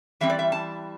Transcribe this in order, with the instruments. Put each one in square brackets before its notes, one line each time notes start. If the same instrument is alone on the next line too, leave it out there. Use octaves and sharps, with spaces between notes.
[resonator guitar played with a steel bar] E3 G3 C4 E5
D5
E5
A5